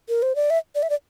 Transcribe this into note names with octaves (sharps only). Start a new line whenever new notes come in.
A#4
C5
D5
E5
D5
E5
D5